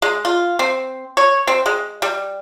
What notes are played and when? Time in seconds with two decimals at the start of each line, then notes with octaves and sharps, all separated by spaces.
0.02 G#3
0.25 F4
0.59 C4
1.17 C#5
1.47 C4
1.66 G#3
2.02 G3